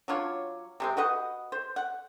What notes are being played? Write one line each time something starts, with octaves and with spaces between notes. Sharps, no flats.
F#3 D4 F4 C#5
C3 G#3 C4
F#4 B4 D#5 F#5
C5
F#5